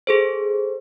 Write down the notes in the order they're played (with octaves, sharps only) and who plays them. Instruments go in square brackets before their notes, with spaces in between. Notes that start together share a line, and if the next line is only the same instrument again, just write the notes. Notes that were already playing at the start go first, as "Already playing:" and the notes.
[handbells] G#4 A4 C5